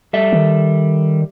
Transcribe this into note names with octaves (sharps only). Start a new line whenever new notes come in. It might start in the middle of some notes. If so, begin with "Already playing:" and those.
G3 A4 E5
D#3